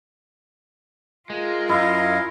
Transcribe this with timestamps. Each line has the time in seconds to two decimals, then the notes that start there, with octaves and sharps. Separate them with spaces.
1.30 G#3 F4 A#4
1.69 F#2 E4 D#5 F5